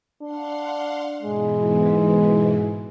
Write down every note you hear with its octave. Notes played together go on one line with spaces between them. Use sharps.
D4 F5 F#5 C6
G#2 B2 E3 G#3